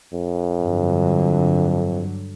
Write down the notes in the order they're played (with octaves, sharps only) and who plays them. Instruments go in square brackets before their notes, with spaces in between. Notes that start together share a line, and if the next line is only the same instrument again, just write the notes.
[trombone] F2
[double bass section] G2 D3 F#3